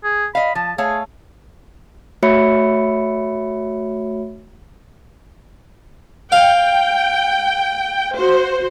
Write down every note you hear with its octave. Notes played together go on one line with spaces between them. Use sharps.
G#4
D#5 F5 B5
F3 A5
A3 G#4 C#5 F5
A3 F#4 C#5 E5 B5 C#7
F5 G5
F#4 C5